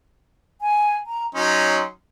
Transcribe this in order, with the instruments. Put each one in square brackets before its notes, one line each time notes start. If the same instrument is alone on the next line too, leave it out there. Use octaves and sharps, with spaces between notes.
[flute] G#5
A#5
[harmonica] F#3 C#4 D#4 [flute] C6